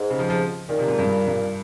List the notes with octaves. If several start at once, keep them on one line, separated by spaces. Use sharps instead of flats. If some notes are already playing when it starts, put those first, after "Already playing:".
Already playing: G#2
C#3
F3
F3
A#2 D#3
C3
G#2
G2
G2